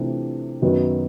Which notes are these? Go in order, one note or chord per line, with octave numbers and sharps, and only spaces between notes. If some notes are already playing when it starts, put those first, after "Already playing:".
Already playing: C3 E3 A3 D4 F4
F#2 D#3 F#3 B3